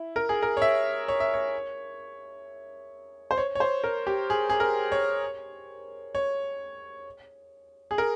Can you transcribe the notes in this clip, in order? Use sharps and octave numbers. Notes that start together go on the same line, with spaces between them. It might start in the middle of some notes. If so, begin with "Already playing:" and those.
Already playing: E4
A#4
G#4
A#4
C#5
E5
C#5
E5
C#5
C5
C#5
C#5
C5
A#4
G4
G#4
G#4
A#4
C#5
C#5
G#4
A#4